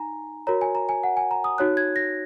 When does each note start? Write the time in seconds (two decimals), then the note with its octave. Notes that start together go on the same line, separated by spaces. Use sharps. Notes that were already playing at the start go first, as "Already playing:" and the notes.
Already playing: D#4 G#5 A#5
0.47 F#4 A#4 C#5 A#5
0.61 G#5
0.75 A#5
0.89 G#5
1.04 F#5
1.17 G#5
1.31 A#5
1.44 D#6
1.58 D#4 F#4 C#5 F#6
1.77 G#6
1.96 A#6